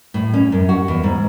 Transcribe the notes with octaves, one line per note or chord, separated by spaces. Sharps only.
A2
C#4
F#2
F#4
E2
G#2